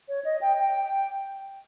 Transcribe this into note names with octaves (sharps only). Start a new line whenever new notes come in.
C#5
D#5
G5
G5